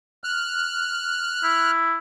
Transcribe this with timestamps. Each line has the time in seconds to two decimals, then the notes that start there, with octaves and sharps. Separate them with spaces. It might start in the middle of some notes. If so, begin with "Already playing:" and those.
0.24 F6 F#6
1.43 E4